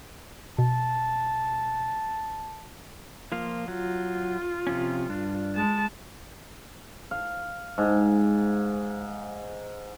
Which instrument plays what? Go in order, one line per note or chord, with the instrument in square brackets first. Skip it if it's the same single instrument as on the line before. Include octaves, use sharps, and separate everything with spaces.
[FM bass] B2 [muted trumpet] A5
[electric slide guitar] F3 A#3 F4
[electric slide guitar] F#3 [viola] F4
[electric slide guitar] C3 F3 C#4
G2 D4
[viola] G#3 A5
[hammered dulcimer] F5
G#2